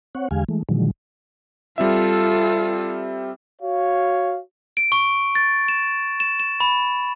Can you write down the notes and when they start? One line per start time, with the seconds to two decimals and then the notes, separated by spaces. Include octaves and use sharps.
0.15 C4 C#5 F#5
0.31 E2 D3 G#3 G4 F5 G#5
0.49 E3 G#3 A3
0.69 A#2 D3 D#3 F3 F#3 G#3
1.78 G3 C4 F4 A4 E5
3.62 F#4 C#5 F5
4.77 D7
4.92 C#6
5.35 A6
5.68 E7
6.20 E7
6.40 E7
6.60 B5